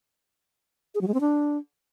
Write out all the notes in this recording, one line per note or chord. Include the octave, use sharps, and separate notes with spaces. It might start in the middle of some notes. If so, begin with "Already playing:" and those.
G#4
F#3
G#3
C4
D4